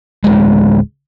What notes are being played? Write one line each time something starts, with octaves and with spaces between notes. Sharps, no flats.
D1 G#3